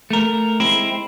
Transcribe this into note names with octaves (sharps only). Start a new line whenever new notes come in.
A3 A#4
G#3 C4 E4